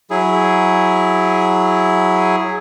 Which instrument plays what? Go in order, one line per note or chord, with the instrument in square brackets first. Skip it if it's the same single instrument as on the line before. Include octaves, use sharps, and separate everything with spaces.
[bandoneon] F#3 E4 G#4